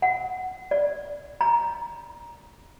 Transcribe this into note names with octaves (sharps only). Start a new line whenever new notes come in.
F#5
D5
A#5